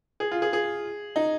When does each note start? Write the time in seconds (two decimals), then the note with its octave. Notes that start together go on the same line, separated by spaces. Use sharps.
0.20 G#4
0.32 F4
0.42 G#4
0.53 G#4
1.16 D#4